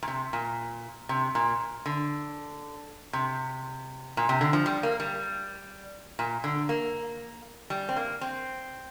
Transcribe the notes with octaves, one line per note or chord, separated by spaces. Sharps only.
A#2
C3
A#2
C3
A#2
D3
C3
A#2
C3
D3
F3
G3
A#3
G3
A#2
D3
A#3
G3
C4
A#3
C4